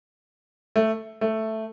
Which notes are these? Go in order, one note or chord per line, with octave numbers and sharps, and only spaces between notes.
A3
A3